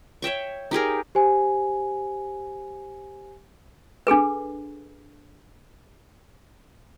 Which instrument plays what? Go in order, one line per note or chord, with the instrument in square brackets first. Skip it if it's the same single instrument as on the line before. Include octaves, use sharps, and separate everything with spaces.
[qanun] C#5 E5 G5 C#6
D#4 G4 G#4 A#4
[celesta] G4 C5 G#5
[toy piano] D4 G#4 A4 B4